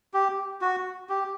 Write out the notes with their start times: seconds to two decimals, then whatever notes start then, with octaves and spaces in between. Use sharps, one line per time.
0.14 G4
0.61 F#4
1.09 G4